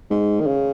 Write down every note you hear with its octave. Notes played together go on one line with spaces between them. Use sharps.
G#2
D#3
C#3